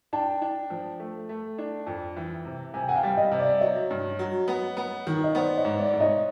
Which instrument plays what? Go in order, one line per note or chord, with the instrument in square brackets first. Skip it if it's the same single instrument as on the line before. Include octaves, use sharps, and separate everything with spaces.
[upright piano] D4 [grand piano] G5 A5
[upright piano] D4
F3
A3
A3
D4
F2
E3
C3
[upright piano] C3 [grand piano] G#5
[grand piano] G5
F#5 G#5
F5 G5
[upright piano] G3
[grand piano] D#5 F5
[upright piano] C3
[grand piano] D5 E5
[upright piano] F#3 [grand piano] C#5 D#5
[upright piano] G2
F#3
B3
B3
D#3
[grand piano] D#5
[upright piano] B3 [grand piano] C5 D5
[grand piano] C#5 D#5
[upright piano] G#2
[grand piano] D5 E5
[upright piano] G#2
[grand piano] C#5 D#5